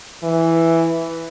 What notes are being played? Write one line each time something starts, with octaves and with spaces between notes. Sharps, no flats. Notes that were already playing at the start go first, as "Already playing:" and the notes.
E3